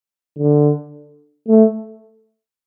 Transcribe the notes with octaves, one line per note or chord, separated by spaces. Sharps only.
D3
A3